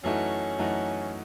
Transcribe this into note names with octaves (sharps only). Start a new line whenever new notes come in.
F#2 E3 A3 C#4 D#4 F#4
F#2 E3 A3 D#4 F#4